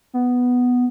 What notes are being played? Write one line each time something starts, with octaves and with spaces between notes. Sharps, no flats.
B3